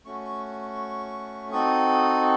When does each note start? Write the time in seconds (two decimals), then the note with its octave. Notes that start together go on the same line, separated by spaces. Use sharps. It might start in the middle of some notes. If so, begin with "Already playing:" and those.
0.05 A3 C#4 F#4 C#6
1.52 C4 D#4 F#4 A4 D#6